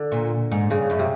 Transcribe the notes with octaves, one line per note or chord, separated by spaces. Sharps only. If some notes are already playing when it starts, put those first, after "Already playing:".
Already playing: D3
A#2
G#2
G2 C#3
F#2
C3